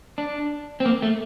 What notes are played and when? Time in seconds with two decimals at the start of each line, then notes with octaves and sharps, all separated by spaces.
0.18 D4
0.80 C4
0.85 A#3
1.02 A3